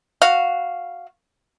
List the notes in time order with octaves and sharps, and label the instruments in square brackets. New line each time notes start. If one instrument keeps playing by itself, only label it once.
[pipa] F#4 F5